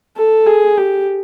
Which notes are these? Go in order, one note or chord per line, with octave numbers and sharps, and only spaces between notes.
A4
G#4
G4